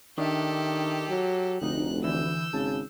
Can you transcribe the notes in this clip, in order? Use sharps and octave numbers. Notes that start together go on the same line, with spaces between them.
D#3 D4 G4 A4 E5
F#3
F1 D2 D3 D#4 F#6
D3 E3 E6 G6
G#1 C#3 A5